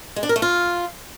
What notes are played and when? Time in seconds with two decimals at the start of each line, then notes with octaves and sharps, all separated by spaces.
0.16 G#3
0.23 D4
0.29 A#4
0.36 A3
0.42 F4